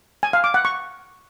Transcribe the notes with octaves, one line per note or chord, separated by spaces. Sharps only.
G#5
F5
D6
F#5
C#6